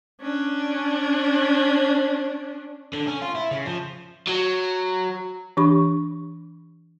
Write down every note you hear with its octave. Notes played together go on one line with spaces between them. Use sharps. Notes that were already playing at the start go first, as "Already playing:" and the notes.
C#4 D4
D3
C#4
F4
E4
C#3
F3
F#3
E3 D4 G4 B5 C#6